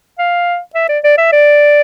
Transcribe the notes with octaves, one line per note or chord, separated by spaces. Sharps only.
F5
E5
D5
D5
E5
D5